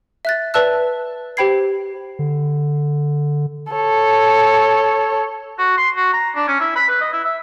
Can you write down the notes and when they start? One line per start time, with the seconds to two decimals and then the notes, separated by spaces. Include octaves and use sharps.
0.25 E5 F#6 A6
0.54 B4 D5 E5 A5 E6 F#6
1.37 G4 C5 G5 B5 G#6 C7
2.19 D3
3.72 A4 C#5
5.58 F#4
5.77 C6
5.96 F#4
6.13 A#5
6.35 D4
6.48 C#4
6.60 E4
6.76 B5
6.88 B4
7.01 D#5
7.13 E4
7.24 E5